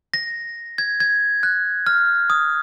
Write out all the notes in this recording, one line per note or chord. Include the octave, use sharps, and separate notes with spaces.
A#6
G#6
G#6
F#6
F6
D#6